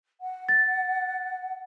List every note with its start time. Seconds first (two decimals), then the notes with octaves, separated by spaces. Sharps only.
0.21 F#5
0.49 A6